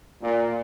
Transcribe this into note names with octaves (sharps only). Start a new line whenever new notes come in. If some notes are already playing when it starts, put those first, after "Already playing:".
A#2